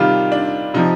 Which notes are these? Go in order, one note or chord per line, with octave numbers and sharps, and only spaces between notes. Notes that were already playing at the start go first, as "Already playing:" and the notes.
Already playing: C3 D#3 G3 F4
D4
C3 F3 D#4